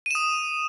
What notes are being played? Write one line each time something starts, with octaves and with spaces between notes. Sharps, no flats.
D#6 D#7 E7